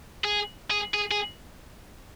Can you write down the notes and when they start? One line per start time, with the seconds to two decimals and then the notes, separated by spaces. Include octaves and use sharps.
0.24 G#4
0.71 G#4
0.94 G#4
1.11 G#4